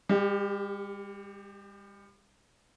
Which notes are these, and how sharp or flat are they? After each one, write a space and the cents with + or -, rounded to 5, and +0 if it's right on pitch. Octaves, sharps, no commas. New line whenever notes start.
G3 +45 G4 +0